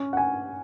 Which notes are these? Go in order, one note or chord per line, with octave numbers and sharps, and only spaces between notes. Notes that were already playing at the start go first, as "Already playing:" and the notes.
Already playing: C#4
F#5
G#5